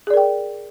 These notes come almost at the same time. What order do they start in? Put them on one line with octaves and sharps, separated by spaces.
G#4 D5 A#4 G5